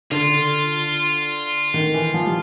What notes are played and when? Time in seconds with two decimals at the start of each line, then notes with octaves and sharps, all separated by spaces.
0.11 D3 F4
1.74 D#3
1.94 E3
2.14 F3
2.26 G3